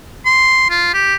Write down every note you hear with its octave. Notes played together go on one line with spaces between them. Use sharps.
C6
F4
G4